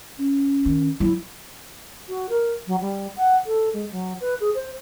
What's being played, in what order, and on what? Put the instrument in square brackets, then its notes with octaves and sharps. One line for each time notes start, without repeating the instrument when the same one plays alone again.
[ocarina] C#4
[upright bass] D#3
[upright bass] F#3 [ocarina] E4
[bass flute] F#4
A#4
F#3
G3
F#5
A4
G#3
F#3
B4
G#4
C5